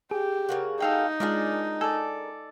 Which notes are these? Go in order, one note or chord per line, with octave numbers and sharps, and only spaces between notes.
G4 G#4
C#3 A#3 F#4
D#4 A4 F5 G5
G#3 D4 F4 G#4 A#4 D5
A4 D5 G#5